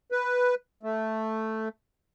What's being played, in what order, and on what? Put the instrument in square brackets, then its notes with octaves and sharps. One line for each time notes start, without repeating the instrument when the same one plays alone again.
[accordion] B4
A3